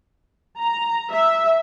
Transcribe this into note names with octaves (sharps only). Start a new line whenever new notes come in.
A#5
E5